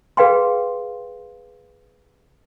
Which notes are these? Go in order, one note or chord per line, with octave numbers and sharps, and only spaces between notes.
G#4 B4 F5 G5 C6